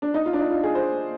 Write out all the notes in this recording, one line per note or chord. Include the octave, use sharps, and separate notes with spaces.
D4
D#4
F4
D4
D#4
F4
G#4
C5